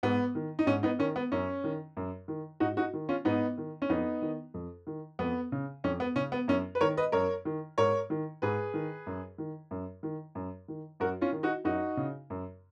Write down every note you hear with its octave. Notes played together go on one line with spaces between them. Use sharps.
G#2 B3
D#3
D#4
G#2 C#4
B3 D#4
D#3 C#4
B3
F#2 C#4
D#3
F#2
D#3
G#2 D#4 F#4
D#4 F#4
D#3
C#4 F4
G#2 B3 D#4
D#3
C#4
F2 B3 D#4
D#3
F2
D#3
F2 B3
C#3
F2 C#4
B3
C#3 C#4
B3
F#2 C#4
B4
D#3 A#4 C#5
B4 D#5
F#2 A#4 C#5
D#3
G#2 A#4 C#5
D#3
G#2 G#4 B4
D#3
F#2
D#3
F#2
D#3
F#2
D#3
F#2 F#4 A#4
C#4 F4
D#3
D#4 F#4
F#2 D#4 F#4
C#3
F#2